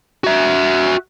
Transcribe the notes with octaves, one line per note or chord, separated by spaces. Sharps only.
F#4 E5